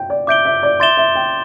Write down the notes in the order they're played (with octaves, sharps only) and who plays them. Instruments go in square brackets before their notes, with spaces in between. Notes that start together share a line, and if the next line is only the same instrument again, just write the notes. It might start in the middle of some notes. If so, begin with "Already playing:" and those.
Already playing: [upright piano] G5
D5
[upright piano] E5 [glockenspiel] D6 G6 D7 G7
[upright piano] E5
D5
[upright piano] E5 [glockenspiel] C6 A6 E7 G7
[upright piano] E5
G5